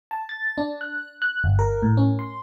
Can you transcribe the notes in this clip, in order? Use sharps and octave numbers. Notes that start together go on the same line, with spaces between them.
A5
A6
D4
F#6
F#6
G1
A#4
A2
C#4
C6